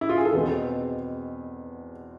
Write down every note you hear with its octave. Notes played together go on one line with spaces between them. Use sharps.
E4
F4
G#4
A4
E2 B2 G#3 C4 B4